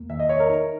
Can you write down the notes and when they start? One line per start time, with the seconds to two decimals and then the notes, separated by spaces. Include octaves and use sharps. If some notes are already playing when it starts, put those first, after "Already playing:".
Already playing: E2 A#3
0.09 D#3 E5
0.19 D#5
0.29 D#3 C#5
0.39 A#4
0.49 D#4